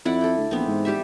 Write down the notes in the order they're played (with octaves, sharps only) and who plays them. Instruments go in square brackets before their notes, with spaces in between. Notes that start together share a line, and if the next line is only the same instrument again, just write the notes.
[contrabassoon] F2 [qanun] E4 D5 F#5
[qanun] A4 G5
[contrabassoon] D2
[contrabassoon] A#1 [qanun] E3 B3 C4
[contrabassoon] G#2
[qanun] G3 G4 E5